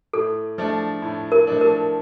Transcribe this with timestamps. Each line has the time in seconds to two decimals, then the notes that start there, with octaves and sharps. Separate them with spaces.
0.13 A2 A4
0.58 F3 A3 D4
1.02 A2
1.32 A#4
1.47 F3 A3 D4
1.61 A#4